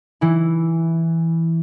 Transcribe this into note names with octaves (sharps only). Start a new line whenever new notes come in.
E3 E4